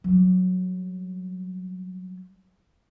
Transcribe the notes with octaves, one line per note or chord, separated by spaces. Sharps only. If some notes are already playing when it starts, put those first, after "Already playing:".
F#3 G3